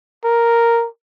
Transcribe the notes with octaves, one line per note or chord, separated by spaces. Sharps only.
A#4